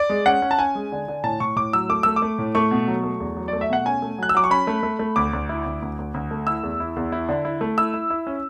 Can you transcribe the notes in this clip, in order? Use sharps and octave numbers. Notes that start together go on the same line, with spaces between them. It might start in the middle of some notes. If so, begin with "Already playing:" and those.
Already playing: D5
G#3
C#4 F#5
C#4
A5
C#4 G#5
G#3
D3
D3
A2 A5
A2 C#6
A2 D6
F#3 E6
A3 D6
A3 E6
D6
A3
A2
A3 C#6
B2
F#3
A3
E2
F#3
A3 D5
E5
B2 F#5
C#4 G#5
A3
F#3 F#6
E6
F#3 D6
C#6
C#4 B5
A3
A3
A3
D2 D6
D2
E4
D2
D2
D2
D2
A3
E4 E6
E2
E4
E2
E4
D3
E4
A3
E4 E6
E4
E4
C#4